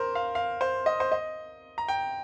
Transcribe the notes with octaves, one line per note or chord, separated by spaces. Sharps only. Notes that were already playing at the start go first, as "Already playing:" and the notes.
Already playing: A#4 C5
F5
F5
C5
D#5
C5
D#5
A#5
G5